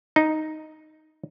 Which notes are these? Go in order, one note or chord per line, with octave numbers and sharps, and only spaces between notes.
D#4